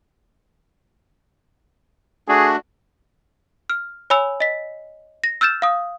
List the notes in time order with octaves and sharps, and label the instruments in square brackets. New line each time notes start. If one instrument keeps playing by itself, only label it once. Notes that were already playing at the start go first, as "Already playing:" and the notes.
[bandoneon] A3 D4 F#4 [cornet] G#4
[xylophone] F6
C#5 G#5 B5 E6 F7
D#5 B6
A#6
E6 F6 G6 A6 E7
F5 D#6